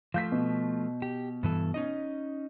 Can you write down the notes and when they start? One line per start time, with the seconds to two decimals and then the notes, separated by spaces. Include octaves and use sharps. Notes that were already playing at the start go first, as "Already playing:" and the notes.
0.14 F3 A3 F5 G6 B6
0.32 B2
1.02 G4
1.43 G2 E3 A4
1.74 C#4 D#4 D#5